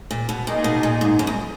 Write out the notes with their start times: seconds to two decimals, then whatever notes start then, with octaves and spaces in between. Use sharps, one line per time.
0.11 A#2
0.29 B2
0.46 A#2 A#3 D#4 G#4 D#5
0.64 B2
0.83 A#2
1.01 G#2
1.19 F#2
1.27 E2